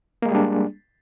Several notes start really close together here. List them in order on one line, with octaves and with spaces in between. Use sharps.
A#3 G#3 G#4 G3 D4